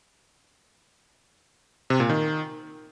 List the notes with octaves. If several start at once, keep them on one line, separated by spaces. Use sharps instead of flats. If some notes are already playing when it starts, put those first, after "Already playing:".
C3
A#2
D#3